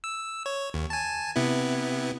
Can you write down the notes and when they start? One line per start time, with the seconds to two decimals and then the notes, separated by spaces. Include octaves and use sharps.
0.04 E6
0.46 C#5
0.74 D#2
0.90 G#5 A5
1.36 C3 B3 E4